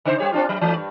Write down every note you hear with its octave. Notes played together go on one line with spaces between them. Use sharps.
C#3 D#4 C5
G3 G4 C#5
C4 D4 F4
F#3
E3 A3
G2